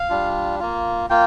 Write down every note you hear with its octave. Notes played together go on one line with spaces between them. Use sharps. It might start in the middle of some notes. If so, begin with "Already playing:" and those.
Already playing: F5
G3 D4 F4
A#3 F4
A#3 F4 G5